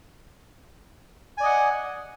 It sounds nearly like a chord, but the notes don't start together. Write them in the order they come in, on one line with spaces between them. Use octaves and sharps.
G#5 D5 D#5 F#5